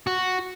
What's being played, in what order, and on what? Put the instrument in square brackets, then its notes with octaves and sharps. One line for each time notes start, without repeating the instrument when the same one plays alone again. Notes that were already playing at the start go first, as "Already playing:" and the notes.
[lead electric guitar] F#4